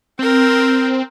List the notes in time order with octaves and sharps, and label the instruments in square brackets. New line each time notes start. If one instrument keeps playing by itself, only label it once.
[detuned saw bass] C4 [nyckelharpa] A#4 G5